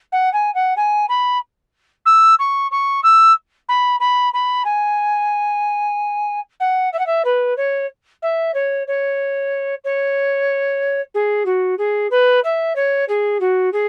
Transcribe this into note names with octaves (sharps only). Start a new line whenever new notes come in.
F#5
G#5
F#5
G#5
B5
E6
C#6
C#6
E6
B5
B5
B5
G#5
F#5
E5
F#5
E5
B4
C#5
E5
C#5
C#5
C#5
G#4
F#4
G#4
B4
E5
C#5
G#4
F#4
G#4